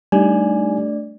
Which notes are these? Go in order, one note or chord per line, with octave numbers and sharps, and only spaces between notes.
G3 A3 D4 D#4 D5 G#5